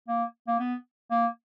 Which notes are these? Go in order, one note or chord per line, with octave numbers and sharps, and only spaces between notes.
A#3
A#3
B3
A#3